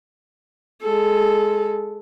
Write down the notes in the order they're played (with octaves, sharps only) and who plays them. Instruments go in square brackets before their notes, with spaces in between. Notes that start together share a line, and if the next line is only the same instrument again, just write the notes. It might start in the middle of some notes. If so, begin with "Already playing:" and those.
[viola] G#3 A4